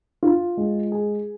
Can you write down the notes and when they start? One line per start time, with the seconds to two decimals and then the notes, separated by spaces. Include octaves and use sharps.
0.23 F4
0.57 G#3
0.92 G#4